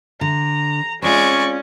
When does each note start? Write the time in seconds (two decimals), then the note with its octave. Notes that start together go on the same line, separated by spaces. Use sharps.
0.21 D3 A#5
1.02 G#3 C4 C#4 F4 D5 C#6